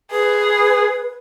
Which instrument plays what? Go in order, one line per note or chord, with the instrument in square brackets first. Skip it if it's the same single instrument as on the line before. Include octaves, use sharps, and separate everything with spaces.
[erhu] G#4 [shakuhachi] B4